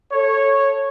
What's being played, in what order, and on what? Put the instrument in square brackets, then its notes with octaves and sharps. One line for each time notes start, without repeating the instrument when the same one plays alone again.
[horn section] A4 C#5